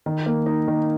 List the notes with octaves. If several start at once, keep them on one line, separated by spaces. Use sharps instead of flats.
D#3
A#3
D#4
D#3